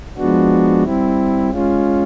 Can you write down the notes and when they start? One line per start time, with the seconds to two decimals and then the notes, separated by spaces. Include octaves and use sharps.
0.17 F3 G#3 B3 D4 F#4
0.83 G3 C4 E4
1.50 G#3 C#4 F4